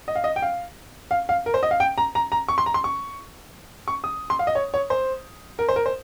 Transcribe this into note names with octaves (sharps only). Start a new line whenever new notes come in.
D#5
F5
D#5
G5
F5
F5
F5
A#4
C5
D#5
F5
G5
A#5
A#5
A#5
C#6
C6
A#5
C6
C#6
C#6
D#6
C6
F5
D#5
C#5
C#5
C5
A#4
C5
A#4
C5